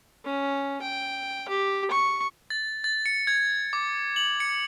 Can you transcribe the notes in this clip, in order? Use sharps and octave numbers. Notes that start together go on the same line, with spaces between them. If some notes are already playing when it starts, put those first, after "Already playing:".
C#4
G5
G4
C#6
A6
A6
C#7
G#6
D6
F#7
C#7